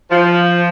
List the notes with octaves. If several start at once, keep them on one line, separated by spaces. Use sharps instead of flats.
F3